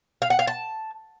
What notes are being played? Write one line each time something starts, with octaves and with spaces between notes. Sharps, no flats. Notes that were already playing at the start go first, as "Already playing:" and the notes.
F5
F#5
F5
A5